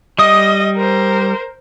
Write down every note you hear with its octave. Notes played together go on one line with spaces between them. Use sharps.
G3 D#5 D#6
A#4 C5